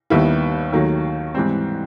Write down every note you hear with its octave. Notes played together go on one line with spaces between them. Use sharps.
D#2 D#3 G3 B3 E4
D#2 D#3 F#3 A3
G#2 E3 G3 C4